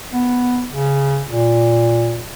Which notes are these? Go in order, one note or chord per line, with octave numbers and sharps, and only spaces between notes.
B3
C#3
A#2